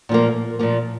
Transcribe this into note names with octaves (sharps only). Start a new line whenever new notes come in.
A#2 F3 A#3
A#2 F3 A#3